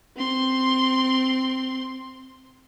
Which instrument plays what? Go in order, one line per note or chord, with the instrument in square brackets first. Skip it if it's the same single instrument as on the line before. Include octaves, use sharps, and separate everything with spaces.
[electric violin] C4 C6